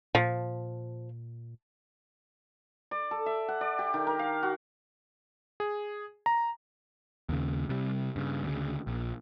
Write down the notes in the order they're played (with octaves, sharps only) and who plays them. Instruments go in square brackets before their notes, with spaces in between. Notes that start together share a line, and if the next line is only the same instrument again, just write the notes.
[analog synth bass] A#2 [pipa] F3
[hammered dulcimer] D5
A4
E5
F#5
D5
G4
D#3
A#4
F5
F#4
[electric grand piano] G#4
A#5
[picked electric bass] D#2 C#3
C3 G3
G2 C#3
D2 C#3
A#1